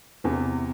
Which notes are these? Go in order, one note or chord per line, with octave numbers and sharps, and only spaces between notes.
E2 C3 E3